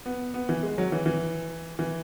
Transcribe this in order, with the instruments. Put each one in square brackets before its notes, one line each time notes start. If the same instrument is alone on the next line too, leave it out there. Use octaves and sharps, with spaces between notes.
[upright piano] B3
B3
E3
G#3
F#3
E3
E3
E3